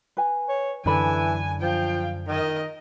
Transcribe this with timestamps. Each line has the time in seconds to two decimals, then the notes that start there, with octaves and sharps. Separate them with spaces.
0.17 B4 G#5
0.49 C#5
0.86 F#2 D3 E3 D4 A4 G#5 B5
1.61 F3 F5 G5
2.27 D#3 A#4 D#5